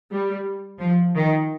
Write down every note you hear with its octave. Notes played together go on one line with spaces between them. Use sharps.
G3
F3
D#3